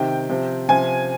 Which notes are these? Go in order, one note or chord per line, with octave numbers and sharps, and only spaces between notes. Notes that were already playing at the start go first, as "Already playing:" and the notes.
Already playing: C3 D#3 G5
C3 F3
C3 F3 G#5